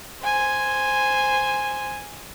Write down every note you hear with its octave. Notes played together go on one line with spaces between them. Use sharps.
C5 G#5